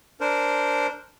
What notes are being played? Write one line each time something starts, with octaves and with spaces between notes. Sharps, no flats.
D4 A#4 C5